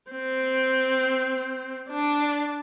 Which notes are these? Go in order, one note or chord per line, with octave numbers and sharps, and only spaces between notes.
C4
D4